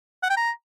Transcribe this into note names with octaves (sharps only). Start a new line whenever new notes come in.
F#5
G5
A#5